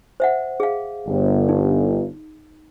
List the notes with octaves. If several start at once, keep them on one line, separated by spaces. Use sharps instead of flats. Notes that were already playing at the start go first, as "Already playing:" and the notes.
C5 E5 F#5
G#4 F5
G1
D#4